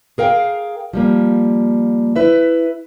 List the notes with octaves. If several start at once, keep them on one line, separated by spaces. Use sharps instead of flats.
G#4 A#4 F5 G5
F3 G3 A#3
E4 B4 E5